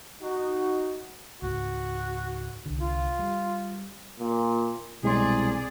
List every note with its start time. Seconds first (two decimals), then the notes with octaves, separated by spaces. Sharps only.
0.21 D#4 F#4
1.42 C#2 G#2 F#4
2.66 C2 D3
2.80 F4
3.19 G3
4.19 A#2
5.03 C2 B2 G#3 G#4 D5 C6